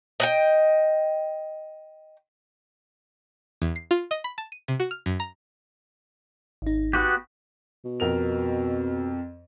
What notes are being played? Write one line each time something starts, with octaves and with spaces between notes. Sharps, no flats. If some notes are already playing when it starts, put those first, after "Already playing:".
D#5 F#5 G5
E2
C7
F4
D#5
B5
A5
D#7
C3
F#4
F6
F#2
A#5
G#1 D#4
B3 F#4 G4
B2
F2 A#4 F7